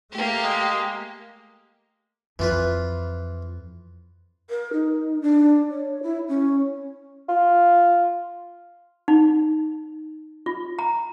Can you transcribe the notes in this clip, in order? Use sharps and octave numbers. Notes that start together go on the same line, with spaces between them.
A3 A#3 G4
G#3
F2 E3 F4 B4
A#4
D#4
D4
C#5
E4
C#4
F4
D#4
F4
A#5